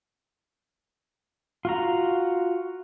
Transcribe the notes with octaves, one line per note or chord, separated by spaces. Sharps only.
F4 F#4 A#5